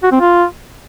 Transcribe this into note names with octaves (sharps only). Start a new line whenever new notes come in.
F#4
C4
F4